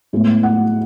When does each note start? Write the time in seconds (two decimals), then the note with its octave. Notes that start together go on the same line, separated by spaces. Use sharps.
0.13 A2 G#3 B3
0.43 F#5